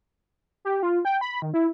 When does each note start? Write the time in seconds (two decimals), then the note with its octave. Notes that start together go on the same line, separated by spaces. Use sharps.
0.65 G4
0.83 F4
1.05 G5
1.21 B5
1.42 D#3
1.54 E4